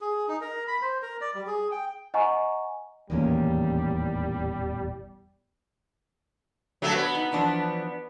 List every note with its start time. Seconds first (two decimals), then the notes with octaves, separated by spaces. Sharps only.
0.01 G#4
0.28 D#4
0.41 A#4
0.68 B5
0.82 C5
1.02 A#4
1.21 D5
1.34 G3
1.47 G#4
1.71 G5
2.14 D#5 F#5 G#5 A#5 C#6
3.10 D#1 A1 E2 D#3 G3 A#3 C#4
6.82 F#3 A3 D4
6.95 B3
7.15 D#4
7.32 E3 F3 D4